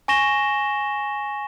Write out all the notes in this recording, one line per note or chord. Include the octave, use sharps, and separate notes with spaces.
G#5 C#6 A#6 E7 G7